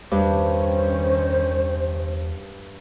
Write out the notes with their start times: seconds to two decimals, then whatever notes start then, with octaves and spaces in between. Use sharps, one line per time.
0.11 E2 G2 D#3 G3 C#4 C5